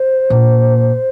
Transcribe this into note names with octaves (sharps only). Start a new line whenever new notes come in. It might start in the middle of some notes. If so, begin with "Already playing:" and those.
Already playing: C5
A#2